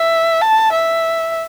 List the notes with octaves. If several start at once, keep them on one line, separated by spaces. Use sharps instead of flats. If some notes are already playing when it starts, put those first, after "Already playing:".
Already playing: E5
A5
E5